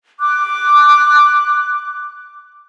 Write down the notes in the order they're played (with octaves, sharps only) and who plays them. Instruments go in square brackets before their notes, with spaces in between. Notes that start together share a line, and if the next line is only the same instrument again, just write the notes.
[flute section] D6 F#6